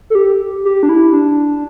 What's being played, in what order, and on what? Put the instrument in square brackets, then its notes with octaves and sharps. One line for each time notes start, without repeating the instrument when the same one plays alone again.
[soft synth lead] A4
G4
G4
D4
E4
D4